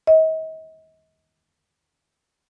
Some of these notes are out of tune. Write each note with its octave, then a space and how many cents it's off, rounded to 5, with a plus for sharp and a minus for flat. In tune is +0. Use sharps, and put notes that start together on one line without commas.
D#5 +40